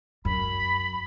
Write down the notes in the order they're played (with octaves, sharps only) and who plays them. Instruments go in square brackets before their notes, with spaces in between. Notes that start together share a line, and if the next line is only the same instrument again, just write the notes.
[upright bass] F#2 [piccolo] B5